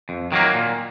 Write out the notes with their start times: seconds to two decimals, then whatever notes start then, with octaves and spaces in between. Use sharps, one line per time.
0.09 F2
0.32 D#3 F#3 A#3
0.53 A#2